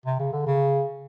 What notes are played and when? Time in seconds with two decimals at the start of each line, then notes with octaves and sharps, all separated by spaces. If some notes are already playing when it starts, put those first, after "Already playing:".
0.05 C3
0.19 C#3
0.32 D3
0.46 C#3